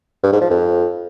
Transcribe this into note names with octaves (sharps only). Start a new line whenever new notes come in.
G2
G#2
F3
F2